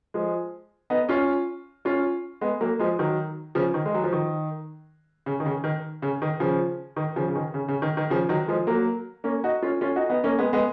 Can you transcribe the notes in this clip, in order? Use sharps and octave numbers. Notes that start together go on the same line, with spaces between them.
F3 G#3
B3 D#4
C#4 F4
C#4 F4
G#3 B3
F#3 A#3
F3 G#3
D#3 F#3
C#3 F3
D#3
G#3
F#3
F3
D#3
C#3
D#3
C#3
D#3
C#3
D#3
C#3 F3
D#3
C#3 F3
C#3
D#3
C#3
C#3
D#3
D#3
C#3 F3
D#3 F#3
F3 G#3
F#3 A#3
A#3 C#4
D#4 F#4
C#4 F4
C#4 F4
D#4 F#4
B3 D#4
A#3 C#4
G#3 B3
G#3 B3